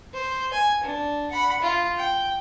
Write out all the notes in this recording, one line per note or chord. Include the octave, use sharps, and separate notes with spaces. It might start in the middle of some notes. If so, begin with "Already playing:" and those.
C5
G#5
D4
F#5 B5
F4
G5